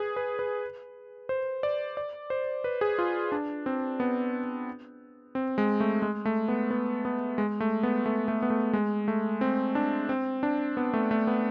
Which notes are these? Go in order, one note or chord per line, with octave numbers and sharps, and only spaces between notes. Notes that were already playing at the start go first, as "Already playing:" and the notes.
Already playing: G#4 B4
B4
B4
C5
D5
D5
C5
B4
G#4
F4
D4
C4
B3
C4
G#3
A3
G#3
A3
B3
B3
B3
G#3
A3
B3
A3
A3
B3
A3
G#3
A3
C4
D4
C4
D4
B3
A3
A3
B3